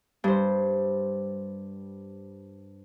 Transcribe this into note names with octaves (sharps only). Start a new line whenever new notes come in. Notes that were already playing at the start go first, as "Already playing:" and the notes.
G2 C5